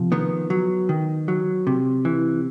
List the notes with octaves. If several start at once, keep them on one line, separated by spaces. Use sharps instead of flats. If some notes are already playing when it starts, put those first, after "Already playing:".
Already playing: C3 F3
D#3 B3
F#3
D#3
F#3
C3
E3